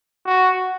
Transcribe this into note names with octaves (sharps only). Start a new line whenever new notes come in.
F#4